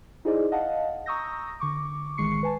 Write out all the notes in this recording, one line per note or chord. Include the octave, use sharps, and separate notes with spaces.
D#4 E4 G#4 C5 D5 D#5
D#5 F5 F#5 A5
A#5 C#6 D#6 E6 G6 A#6
D3 C#6 D6
A1 D#3 G#3 C#6 C7 C#7
B4 G#5 A5